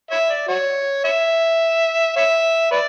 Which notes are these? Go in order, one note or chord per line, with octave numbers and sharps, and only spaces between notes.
C#5 E5
D5
F#4 C#5
C#5 E5
C#5 E5
B4 D5